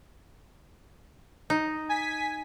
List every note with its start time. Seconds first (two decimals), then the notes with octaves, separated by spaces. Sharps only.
1.50 D#4
1.89 G#5 B6